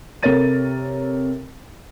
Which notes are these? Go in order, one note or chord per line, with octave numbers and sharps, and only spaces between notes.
C3 A4 A#4 C#5 A6 D#7